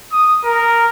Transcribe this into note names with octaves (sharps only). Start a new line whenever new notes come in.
D#6
A#4